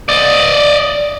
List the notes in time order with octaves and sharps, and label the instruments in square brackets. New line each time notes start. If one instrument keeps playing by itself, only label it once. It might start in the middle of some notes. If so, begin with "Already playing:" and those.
[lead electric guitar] D5 D#5